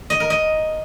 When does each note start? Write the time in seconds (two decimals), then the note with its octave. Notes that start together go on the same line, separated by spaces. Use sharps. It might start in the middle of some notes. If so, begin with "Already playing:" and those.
0.10 D#5
0.20 A#4
0.30 D#5